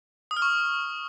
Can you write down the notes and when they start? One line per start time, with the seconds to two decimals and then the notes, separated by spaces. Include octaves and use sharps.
0.31 D#6
0.37 F6
0.42 C#6